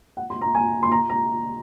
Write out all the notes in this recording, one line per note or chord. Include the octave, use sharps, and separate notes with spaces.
F#5
C6
A#5
G#5
C6
A#5
A#5